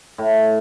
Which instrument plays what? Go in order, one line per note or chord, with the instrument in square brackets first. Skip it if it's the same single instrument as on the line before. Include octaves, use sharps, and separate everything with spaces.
[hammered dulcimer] A2